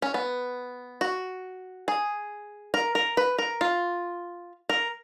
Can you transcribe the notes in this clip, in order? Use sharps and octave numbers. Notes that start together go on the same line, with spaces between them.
C#4
B3
F#4
G#4
A#4
A#4
B4
A#4
F4
A#4